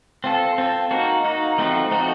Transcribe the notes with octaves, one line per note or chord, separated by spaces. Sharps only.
C4 F4 A4
C4 F4 A4
A#3 D#4 F#4
A#3 D#4 F#4
F3 A3 C4 D#4 F#4
F3 A3 C4 D#4 F#4